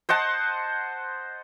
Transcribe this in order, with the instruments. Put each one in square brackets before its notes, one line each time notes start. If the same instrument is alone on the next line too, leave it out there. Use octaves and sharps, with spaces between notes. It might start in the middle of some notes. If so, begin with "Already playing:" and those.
[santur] C5 D#5 F#5 A5